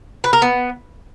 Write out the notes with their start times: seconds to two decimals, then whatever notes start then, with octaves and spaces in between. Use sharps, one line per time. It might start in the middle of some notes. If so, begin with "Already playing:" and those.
0.24 B4
0.33 A#4
0.42 B3